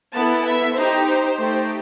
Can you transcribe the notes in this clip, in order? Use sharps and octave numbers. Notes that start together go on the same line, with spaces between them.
B3 E4 A4 A5
E5
D#4 G4 C5
C5
A3 D#4 G4